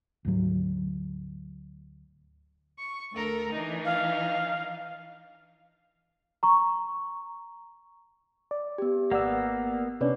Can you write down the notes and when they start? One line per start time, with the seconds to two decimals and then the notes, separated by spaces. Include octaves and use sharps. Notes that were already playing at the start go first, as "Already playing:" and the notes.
0.25 D2 G#2 F#3
2.78 C#6
3.12 D2 A4 A#4
3.52 E3 D4 D#4
3.85 F5
6.43 A#5 C#6
8.51 D5
8.78 B3 G4
9.11 G#1 A#3 B3 D5 F#5 E6
10.01 C3 C#4 D4 B4 C#5 D5